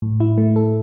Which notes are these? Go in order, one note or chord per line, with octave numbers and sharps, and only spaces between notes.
A2
E4
A3
A4